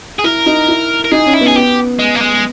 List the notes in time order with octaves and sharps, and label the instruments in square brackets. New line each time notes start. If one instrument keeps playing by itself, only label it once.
[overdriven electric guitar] G#4
[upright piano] E4 [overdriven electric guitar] A#4
[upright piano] D#4
E4
[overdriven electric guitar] A#4
[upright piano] D#4 [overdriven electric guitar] G#4
[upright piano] C#4
[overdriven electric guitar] E4
[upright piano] B3
[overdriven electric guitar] G#4
[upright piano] B3 [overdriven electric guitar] G4
[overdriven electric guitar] G#3
A#3
G#3